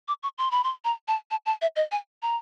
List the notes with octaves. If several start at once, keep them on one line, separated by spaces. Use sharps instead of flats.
D6
C#6
C6
B5
C6
A#5
A5
A5
A5
E5
D#5
G#5
A#5